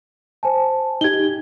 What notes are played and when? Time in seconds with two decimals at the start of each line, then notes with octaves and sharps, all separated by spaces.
0.43 C5 G#5 A5
1.01 D#4 G4 G#6 G7